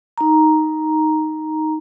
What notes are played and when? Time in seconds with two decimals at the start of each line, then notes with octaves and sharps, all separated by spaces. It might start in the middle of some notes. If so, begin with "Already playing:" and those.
0.18 D#4 A#5